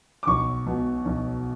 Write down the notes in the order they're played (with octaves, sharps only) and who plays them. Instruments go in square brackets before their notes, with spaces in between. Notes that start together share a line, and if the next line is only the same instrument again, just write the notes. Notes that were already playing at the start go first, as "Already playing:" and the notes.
[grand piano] D6
B1 C#6
B2
B1